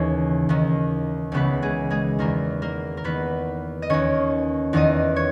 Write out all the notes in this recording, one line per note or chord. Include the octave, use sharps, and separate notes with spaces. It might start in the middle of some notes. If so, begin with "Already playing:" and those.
Already playing: D#2 C#3 E3 C#4 C#5
D#2 D#3
C#2 C#3 E3 B3 B4
G#3 G#4
G#3 G#4
E2 D#3 A#3 A#4
A#3 A#4
A#4
E2 D#3 B3 B4
D#5
D#2 D#3 C#4 C#5
E2 D#3 D#4 D#5
C#5